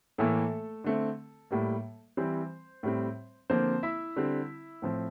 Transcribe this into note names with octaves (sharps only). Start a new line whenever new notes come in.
A2 E3 A3 A#3 A4
D3 A3 C4
A2 G3 A#3
E3 G3 C4 C5
A2 G3 C4
D3 F3 A#3 C4 C5
E4 E5
D3 G3 C4
A2 F3 C4